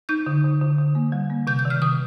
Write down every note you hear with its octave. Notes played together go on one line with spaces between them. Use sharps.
D#4 G6
D3
D3
D3
D3
A#3
G3
A#3
C3 G6
G6
D#3
F6
C3 D#6